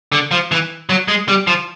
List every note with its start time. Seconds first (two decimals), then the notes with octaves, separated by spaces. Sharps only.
0.12 D3
0.31 F3
0.52 E3
0.89 F#3
1.08 G#3
1.28 G3
1.47 F3